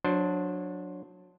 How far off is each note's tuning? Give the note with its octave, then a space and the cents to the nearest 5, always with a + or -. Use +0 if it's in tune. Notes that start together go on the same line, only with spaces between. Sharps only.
F#3 -25 D4 +0 C5 +0